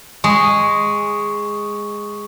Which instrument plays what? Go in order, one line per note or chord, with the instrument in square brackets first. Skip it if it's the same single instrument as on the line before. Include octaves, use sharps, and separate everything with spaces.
[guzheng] G#3 [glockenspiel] C#6 D#6